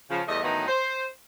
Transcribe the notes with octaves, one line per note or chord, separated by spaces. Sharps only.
C#3 F3
E2 G3 A3 D#5
A2 D#3 E3 F#3 B3 D#4
C5